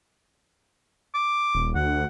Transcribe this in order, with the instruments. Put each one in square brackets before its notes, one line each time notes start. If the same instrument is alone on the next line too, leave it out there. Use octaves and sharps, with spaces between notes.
[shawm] D6
[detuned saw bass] D#1
[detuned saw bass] D2 [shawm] F#5